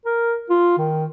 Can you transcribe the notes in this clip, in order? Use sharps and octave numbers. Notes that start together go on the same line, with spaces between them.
A#4
F4
D#3